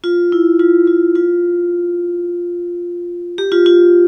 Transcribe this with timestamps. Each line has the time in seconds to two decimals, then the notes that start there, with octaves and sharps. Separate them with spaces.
0.04 F4
0.32 E4
0.60 F4
0.87 F4
1.15 F4
3.38 G4
3.52 F4
3.66 F4